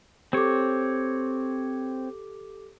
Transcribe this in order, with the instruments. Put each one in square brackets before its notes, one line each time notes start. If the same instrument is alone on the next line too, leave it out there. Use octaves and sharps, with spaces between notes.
[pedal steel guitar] C4 C#5 [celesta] G4 A4 D6